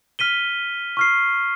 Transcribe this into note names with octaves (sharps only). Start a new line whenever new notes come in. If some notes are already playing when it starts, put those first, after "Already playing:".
F6 B6 D#7 G7
C#6 F6 C7